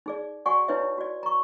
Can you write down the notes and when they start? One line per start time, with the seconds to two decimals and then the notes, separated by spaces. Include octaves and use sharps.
0.06 D#4 G#4 D5
0.46 F#4 D5 F#5 G#5 C#6
0.68 D#4 E4 B4 C#5 D5 E5
0.98 F#4 D5
1.23 A#5 C#6